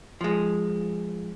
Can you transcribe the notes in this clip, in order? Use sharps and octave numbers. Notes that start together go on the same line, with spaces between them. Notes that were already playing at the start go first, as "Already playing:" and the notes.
F3 G#3